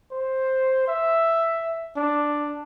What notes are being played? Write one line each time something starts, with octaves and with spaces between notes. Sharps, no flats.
C5
E5
D4